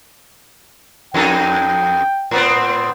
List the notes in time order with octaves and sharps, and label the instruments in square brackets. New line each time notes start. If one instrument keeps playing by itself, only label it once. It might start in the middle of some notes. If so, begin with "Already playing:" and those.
[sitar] F2 D#4 A4 [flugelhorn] G5
[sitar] A2 B3 C4